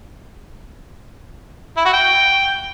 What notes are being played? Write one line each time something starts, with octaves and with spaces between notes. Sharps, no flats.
E4
F#4
G5